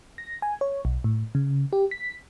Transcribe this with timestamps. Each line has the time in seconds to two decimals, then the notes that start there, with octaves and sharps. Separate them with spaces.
0.18 A#6
0.42 G#5
0.61 C#5
0.85 B1
1.04 A2
1.35 C#3
1.73 G4
1.91 B6